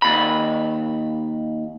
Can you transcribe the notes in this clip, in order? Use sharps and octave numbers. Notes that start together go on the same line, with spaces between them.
D#2 B5